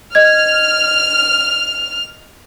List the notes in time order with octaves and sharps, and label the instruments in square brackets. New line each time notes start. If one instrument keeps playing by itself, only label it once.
[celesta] D#5 G#6 [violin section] F6